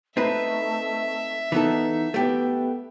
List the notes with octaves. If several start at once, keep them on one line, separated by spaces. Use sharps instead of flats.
A3 C4 D#4 B4 E5
E3 B3 D#4 A4
A3 B3 G4